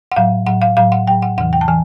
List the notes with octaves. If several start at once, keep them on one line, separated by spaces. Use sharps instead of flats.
F#5
A2 F#3 F5
A2 F#3 F#5
F5
A2 F#3 F5
F#5
A2 F#3 G5
F#5
E2 C3 E3 F#5
G5
A5
E3 G#5